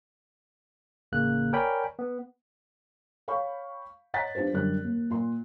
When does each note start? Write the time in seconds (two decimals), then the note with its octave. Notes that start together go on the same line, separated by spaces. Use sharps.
1.12 A1 C#3 A#3 F#6
1.53 A#4 C#5 D5 G5 G#5 B5
1.99 B3
3.28 C#5 F5 G5 B5 C#6
4.14 C#5 D#5 F#5 A#5 A6 B6
4.35 B3 D4 F4 G4 C5
4.53 F#2 D3 G3 F#6
4.84 D#2
5.10 A#2 C6